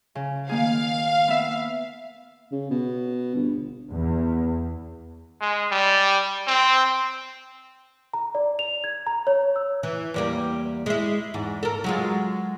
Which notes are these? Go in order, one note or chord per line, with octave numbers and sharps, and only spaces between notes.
C#3
D#3 A#3 G#4 F5
B3 E5
C#3
B2
G1
E2
G#3
G3
C4
A#5
D5
F7
G#6
A#5
C#5
E6
E3
E2 G3 A#3
G#3 E4
E2 G#2
A4 A#4
F#3 G#3 F4